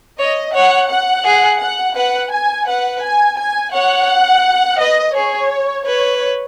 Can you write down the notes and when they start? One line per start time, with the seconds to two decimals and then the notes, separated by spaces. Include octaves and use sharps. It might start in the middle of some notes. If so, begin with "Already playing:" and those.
0.19 C#5 D#5
0.54 C#5 F#5
0.90 F#5
1.25 G#4
1.60 F#5
1.96 B4 F#5
2.32 G#5
2.67 B4 F#5
3.03 G#5
3.39 G#5
3.73 C#5 F#5
4.80 B4 D#5
5.15 G#4 C#5
5.86 B4 C#5